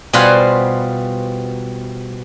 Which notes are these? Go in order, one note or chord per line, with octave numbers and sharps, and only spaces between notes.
B2 G3 F4 C5 F#5 G#5